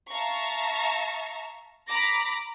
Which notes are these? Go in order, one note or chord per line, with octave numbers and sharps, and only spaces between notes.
E5 F5 A5 A#5 C#6
A#5 B5 D6 A#6